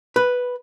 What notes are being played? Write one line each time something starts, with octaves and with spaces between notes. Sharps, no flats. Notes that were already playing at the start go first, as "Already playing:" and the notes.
B4